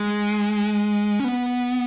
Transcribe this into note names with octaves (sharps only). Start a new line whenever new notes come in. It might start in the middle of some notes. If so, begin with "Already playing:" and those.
Already playing: G#3
C#4
B3